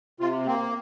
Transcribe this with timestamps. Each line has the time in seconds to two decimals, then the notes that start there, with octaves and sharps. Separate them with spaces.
0.20 C3 F4
0.47 A#3 C4